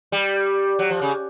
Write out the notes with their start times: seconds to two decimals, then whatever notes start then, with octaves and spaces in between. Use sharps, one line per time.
0.12 G3
0.79 F#3
0.90 F3
1.02 C#3